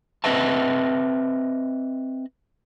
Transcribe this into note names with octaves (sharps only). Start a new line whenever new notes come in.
C4 B4 D#5 E5 A5